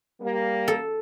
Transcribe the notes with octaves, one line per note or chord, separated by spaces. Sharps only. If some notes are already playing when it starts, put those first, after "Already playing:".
G3 A#3
A4